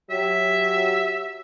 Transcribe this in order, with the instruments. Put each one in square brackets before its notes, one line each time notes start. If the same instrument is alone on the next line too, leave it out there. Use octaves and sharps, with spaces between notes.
[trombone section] F#3 G4 [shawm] E5